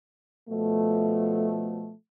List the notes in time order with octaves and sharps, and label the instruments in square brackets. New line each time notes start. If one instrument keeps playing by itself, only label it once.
[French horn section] B2 F3 A3